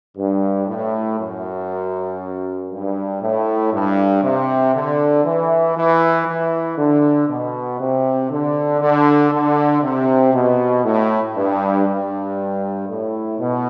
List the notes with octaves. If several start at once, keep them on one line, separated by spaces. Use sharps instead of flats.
G2
A2
F#2
G2
A2
G2
C3
D3
E3
E3
E3
D3
B2
C3
D3
D3
D3
C3
B2
A2
G2
G2
A2
B2